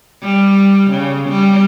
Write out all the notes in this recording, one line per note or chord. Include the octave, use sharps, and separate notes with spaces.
G3
C#3
G3